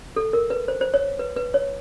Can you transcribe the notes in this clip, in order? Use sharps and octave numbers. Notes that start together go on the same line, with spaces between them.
A4
A#4
B4
C5
C5
C#5
B4
B4
C#5